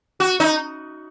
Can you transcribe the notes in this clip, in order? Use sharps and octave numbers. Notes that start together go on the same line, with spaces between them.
F#4
D#4